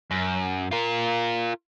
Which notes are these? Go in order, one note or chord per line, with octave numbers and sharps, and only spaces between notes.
F#2
F4 A#4